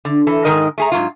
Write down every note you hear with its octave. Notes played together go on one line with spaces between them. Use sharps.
D3
E3 A4
G#2 D#3 A#4 D#5
A3 G#4 A#5
G#2 B2 F#3 F4